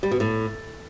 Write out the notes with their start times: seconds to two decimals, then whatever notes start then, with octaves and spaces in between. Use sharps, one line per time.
0.03 G3
0.11 B2
0.20 A2